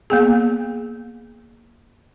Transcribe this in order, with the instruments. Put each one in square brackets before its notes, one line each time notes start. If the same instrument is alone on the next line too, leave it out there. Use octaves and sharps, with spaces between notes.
[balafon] A#3 B3 G#4